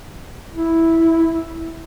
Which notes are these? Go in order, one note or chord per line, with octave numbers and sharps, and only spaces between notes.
E4